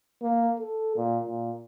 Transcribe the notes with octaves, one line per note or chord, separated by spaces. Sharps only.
A#3
A4
A#2
A#2